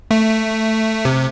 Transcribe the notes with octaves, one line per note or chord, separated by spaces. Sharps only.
A3
C3